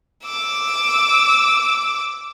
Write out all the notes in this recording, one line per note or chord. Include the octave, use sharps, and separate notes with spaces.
D6 E6